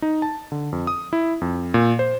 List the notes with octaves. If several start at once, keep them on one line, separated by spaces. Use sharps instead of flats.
D#4
A5
D3
F2
D#6
E4
F2
A#2
C5